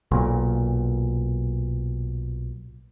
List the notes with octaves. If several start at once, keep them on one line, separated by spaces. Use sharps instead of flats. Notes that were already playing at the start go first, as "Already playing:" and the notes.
B1 A#2